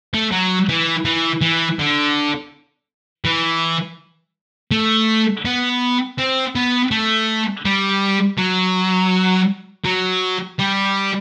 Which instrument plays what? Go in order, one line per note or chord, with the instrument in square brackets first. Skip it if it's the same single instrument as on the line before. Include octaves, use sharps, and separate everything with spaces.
[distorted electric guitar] A3
F#3
E3
E3
E3
D3
E3
A3
B3
C4
B3
A3
G3
F#3
F#3
G3